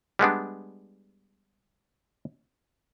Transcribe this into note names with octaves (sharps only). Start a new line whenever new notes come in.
G3 G#3 B3 D4